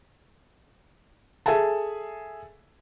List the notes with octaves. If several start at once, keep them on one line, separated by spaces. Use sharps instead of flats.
G#4 A4 E5 G#5 A5